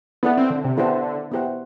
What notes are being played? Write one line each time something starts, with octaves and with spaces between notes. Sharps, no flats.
B3 E4 A4 D5 F#5
C4
D3
C3
D3 B3 E4 G4 C5 F#5
B3 E4 G4 C5 F#5